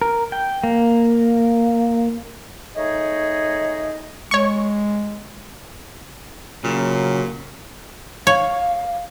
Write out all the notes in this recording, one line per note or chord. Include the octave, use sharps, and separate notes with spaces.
A#4
G5
A#3
A3 D#4 G#4 C#5 D#5
G#3 C#5 C#6
A#2 C#3 F#3
C#5 F5